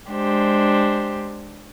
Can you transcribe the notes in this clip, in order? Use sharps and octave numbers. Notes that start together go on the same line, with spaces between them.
G#3 D4 G4 C5